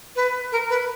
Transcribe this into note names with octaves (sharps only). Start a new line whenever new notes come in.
B4
A#4
B4